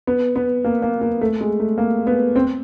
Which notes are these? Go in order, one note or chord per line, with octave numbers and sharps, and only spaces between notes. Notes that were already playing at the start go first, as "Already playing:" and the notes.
B3
B3
A#3
A#3
A#3
A3
G#3
A3
A#3
B3
C4